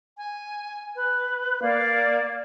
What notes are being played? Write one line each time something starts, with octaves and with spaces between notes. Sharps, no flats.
G#5
B4
A#3 D5 F5